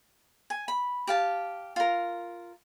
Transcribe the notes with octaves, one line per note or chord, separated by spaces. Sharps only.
G#5
B5
G4 F5 A5
F4 A#4